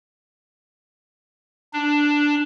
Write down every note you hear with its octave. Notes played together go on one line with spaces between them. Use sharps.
D4